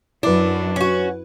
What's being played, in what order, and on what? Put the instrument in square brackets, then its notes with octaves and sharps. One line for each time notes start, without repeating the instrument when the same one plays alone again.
[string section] F#2 [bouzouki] D4 [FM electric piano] E4 B4
[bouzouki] C#4 F#4